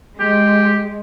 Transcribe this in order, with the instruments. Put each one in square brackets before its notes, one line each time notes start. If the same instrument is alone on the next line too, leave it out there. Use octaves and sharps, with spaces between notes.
[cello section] G#3 [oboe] G4